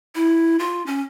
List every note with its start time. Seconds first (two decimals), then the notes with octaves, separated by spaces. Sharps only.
0.15 E4
0.59 F4
0.86 C#4